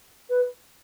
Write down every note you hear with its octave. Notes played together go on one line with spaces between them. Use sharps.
B4